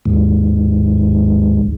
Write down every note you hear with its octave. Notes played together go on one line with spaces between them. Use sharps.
D#2 G#2